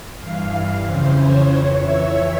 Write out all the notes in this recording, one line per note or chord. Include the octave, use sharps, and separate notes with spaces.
G2 E3 F5
F2 C#3 E3 C5
C#5
F2 E3 C#5
E5